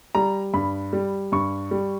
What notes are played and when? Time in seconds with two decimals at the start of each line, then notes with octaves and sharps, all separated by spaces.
0.15 G3 A#5
0.54 G2 B5
0.93 G3
1.32 G2 C#6
1.71 G3